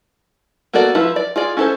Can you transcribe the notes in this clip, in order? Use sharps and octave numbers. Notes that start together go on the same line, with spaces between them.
A#3 B3 F#4 A4 D5
F3 E4 B4
D5
F4 G#4 D5
C#4 E4 A4 A#4 C5